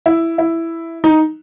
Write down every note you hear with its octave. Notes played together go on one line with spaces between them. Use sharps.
E4
E4
D#4